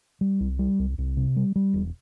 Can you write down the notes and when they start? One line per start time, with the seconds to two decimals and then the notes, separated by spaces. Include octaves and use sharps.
0.21 G3
0.40 C2
0.59 G3
0.79 C2
0.98 C2
1.17 C3
1.36 G3
1.56 G3
1.74 E1